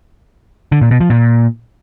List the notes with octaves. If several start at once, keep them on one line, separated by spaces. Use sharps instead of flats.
D3
A#2
B2
F3
A#2